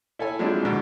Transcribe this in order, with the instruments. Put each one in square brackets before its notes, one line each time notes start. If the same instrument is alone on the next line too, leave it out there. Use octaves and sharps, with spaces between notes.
[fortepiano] E4 A4 C#5 G#5
F3 F#3 G#3 C4 D4 E4
G#2 B2 D3